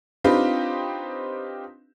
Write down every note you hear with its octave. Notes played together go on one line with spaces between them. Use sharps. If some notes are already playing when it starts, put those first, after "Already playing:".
C4 D4 D#4 F4 G4 B4